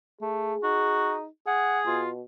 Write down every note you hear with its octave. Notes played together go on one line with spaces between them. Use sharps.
A3 G#4
D#4 F#4
G#4 F#5
B2 F4